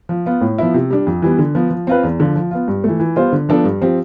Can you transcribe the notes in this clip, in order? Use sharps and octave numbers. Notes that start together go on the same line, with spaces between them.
F3
B3 F4
A2
F3 B3 E4
C3
G3 D4
F2
E3 G3 B3
D3
F3 B3
F3
C4 F4 B4
E2
D3 F3
F3
B3 F4
G2
E3 A3
E3
G3 B3 F4 C5
D3
F3 B3 D4 A4
G2
F3 C4 G4